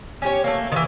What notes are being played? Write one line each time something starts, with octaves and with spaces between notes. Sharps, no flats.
C#4 G4 C#5
A3 A#3
D#3 E3